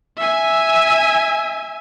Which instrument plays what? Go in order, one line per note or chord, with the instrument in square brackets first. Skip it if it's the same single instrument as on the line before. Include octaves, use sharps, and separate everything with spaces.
[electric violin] E5 G#5